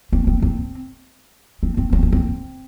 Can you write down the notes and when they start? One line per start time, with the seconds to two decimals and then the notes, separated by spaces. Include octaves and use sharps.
0.13 C4
0.27 C4
0.42 C4
1.63 C4
1.77 C4
1.93 C4
2.03 C#4
2.12 C4